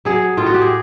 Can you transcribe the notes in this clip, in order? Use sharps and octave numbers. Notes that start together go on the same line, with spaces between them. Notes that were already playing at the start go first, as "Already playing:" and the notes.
F#3 G#4
A2 F4
F#4
G4
G#4